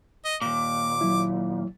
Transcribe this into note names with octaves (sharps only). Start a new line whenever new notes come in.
D#5
D#2 A#2 D6
F#3 E4